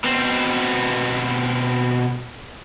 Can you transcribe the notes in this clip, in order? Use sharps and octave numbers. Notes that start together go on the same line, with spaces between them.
B2 C4